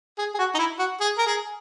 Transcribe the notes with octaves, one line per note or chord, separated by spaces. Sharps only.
G#4
G#4
F#4
D#4
E4
F#4
G#4
A#4
G#4